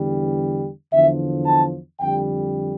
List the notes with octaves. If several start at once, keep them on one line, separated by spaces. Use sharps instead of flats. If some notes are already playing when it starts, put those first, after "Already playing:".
Already playing: E2 D3 G3
E2 D3 F3 E5
A5
F2 D3 G3 G5